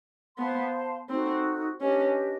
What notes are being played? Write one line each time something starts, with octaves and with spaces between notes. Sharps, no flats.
B3 C5 F5 A5 C6
C4 D#4 F#4 A4
C#4 D4 G4 B4 D#5